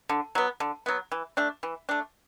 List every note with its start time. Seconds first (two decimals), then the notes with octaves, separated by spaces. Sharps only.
0.09 D3
0.35 F#3 B3
0.60 D3
0.86 F#3 B3
1.12 E3
1.37 A3 D4
1.63 E3
1.89 A3 D4